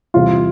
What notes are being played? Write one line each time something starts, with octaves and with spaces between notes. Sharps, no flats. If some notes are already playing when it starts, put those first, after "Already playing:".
E2 C3 G3 F4